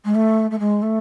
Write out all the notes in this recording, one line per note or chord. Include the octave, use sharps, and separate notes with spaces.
G#3
A3
A3
G#3
A3